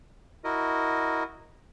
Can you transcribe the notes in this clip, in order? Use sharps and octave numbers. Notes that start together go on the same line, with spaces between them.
E4 F#4 A#4 D#5